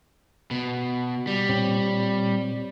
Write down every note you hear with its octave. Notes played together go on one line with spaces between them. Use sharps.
B2
G3
A#2 C4 C#5